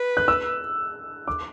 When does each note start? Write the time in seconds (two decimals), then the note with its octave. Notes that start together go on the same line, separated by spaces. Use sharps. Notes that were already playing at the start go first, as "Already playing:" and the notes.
Already playing: B4
0.17 F#6
0.28 E6
1.28 D6